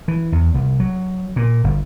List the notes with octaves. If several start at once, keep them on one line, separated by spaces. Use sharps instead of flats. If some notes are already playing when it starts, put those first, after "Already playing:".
E3
E2
C2
F#3
A#2
G1